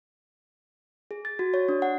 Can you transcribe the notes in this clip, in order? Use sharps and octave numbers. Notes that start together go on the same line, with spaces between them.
G#4
A6
F#4
C#5
D4
F#5